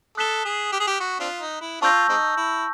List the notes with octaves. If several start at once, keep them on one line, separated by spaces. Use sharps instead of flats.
A4 D#6 F#6 B6 E7 G7
G#4
G4
G#4
G4
F#4
C4 D4 F4
D#4
E4
C4 D4 F4 A5 C#6 E6 G6 A#6
G#3 C4 D#4
E4